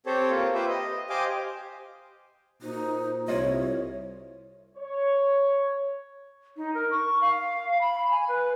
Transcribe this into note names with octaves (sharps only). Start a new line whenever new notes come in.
C4 G4 A4 C5 C#5
A#3 F4
G4 B4 C5 E5
D#5
G4 C5 D#5 F5 G#5 D6
A#2 D#4 F#4 C5
C2 E4 F4 C#5 D#5
C#5
D#4
A#4
C#6
F5
B5
G#5
B4